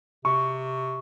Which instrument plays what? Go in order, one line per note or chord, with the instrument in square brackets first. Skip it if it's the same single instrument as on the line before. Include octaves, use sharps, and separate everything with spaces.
[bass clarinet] C3 [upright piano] C#6